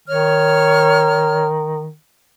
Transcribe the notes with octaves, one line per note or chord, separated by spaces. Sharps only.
D#3 C#5 F6